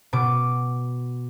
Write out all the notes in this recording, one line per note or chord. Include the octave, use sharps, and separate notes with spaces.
B2 D6